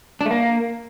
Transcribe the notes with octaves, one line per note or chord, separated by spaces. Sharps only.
D4
A3
A#3